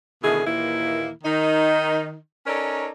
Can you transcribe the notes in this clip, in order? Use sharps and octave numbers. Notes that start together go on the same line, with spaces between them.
B2 D3 D#3 A3 E4 G#4
D#2 A#2 D#3 E3 A#3 E4
D#3 D#4
C#4 D#4 A4 A#4 C#5 D5